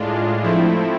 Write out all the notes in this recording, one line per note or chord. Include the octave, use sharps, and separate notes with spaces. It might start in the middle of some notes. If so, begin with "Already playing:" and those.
Already playing: A2 G#3 D4 F4
F3 A3 C4 E4